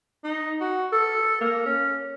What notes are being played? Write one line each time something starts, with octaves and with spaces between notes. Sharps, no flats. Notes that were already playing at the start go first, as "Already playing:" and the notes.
D#4
F#4
A4
A#3
C#4